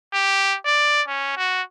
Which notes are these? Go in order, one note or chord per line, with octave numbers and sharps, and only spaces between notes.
G4
D5
C#4
F#4